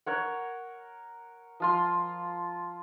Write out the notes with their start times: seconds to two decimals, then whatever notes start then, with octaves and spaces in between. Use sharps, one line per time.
0.06 A#4 C#5 F#5
1.60 F3 F4 C6